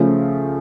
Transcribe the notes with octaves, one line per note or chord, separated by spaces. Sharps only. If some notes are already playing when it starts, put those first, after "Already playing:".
Already playing: C#3 F3 A3